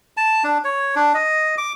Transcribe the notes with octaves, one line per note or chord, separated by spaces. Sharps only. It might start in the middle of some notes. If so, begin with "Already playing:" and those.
A5
D4
C#5
D4
D#5
D6